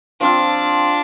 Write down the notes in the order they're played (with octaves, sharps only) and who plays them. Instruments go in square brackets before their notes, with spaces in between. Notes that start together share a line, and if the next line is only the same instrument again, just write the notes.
[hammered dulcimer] F3 C4 F4 [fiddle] D4